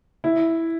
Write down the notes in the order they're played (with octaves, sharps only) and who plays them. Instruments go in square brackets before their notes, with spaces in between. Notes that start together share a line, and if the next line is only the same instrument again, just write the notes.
[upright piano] E4